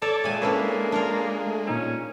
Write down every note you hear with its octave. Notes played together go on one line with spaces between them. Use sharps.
A4 C#5 D5 A5
A#2 G#3 C#5 E5 G5 G#5
A#3 C#4 D4 E4 A4 B4 C#5
D4 F4 A#4
A3
A#2 C#4 D#4 G#6